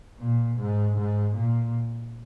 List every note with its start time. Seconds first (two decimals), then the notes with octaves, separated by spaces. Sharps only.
0.19 A#2
0.58 G#2
0.96 G#2
1.36 A#2